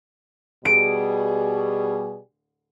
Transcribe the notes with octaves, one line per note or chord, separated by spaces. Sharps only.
B2 G3 G#4 D7